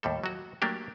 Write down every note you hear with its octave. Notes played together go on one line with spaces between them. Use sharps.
D#2 A2 G3 A4
F#3 F#4
F#3 A3 A#3 D4 G4